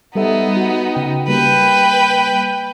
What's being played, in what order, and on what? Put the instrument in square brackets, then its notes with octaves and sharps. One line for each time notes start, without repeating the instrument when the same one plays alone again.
[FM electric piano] G3 A4 E5 [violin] B3 D#4
[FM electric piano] F#4
C#3 G5
[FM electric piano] G3 A#3 [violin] B4 G5